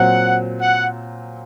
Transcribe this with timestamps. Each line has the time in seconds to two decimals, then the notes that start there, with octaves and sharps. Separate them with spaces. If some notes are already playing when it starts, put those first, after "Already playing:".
Already playing: A#2 F#3 C4 F#5
0.60 F#5